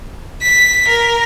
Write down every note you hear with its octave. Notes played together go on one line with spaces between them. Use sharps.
B6
A#4